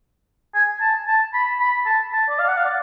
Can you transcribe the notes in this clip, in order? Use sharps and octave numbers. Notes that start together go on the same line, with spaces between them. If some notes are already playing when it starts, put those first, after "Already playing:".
G#5
A5
A5
B5
B5
A5
A5
D5
F5
F#5
F5
D5